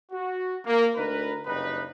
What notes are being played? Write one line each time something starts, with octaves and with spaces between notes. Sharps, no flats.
F#4
A#3
D2 D#4 A#4 B4
F#1 G2 G3 D#4 B4